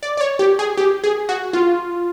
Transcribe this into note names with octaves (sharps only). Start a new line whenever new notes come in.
D5
D5
C#5
G4
G#4
G4
G#4
F#4
F4